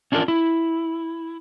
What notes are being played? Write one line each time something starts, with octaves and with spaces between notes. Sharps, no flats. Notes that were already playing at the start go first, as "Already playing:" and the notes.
C#4 D4 F4 F#4 A#4
E4